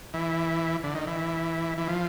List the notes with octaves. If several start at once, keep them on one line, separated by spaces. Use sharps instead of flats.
E3
D3
D#3
E3
E3
F3